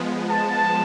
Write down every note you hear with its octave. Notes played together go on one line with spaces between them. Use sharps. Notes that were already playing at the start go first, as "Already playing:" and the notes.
Already playing: F3 G#3 B3
A5